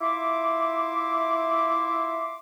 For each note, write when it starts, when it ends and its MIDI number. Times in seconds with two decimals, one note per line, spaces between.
0.01 2.39 64
0.01 2.39 65
0.01 2.39 76
0.01 2.39 84
0.01 2.39 86